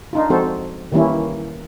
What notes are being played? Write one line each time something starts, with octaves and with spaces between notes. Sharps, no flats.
D4 D#4 F4
F3 G#3 C4 F#4 A4 C5
D#3 E3 G3 A#3 C#4 E4